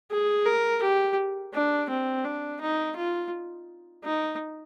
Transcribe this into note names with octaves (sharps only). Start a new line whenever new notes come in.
G#4
A#4
G4
D4
C4
D4
D#4
F4
D#4